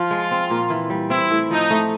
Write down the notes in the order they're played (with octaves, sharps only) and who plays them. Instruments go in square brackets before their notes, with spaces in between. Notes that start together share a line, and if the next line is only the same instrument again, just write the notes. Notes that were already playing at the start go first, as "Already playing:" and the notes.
Already playing: [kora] F3 [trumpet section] F4
[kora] G#3
C4
A#2
E3
G3
[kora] C4 [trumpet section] E4
[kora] A2
[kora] F3 [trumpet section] D#4
[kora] A3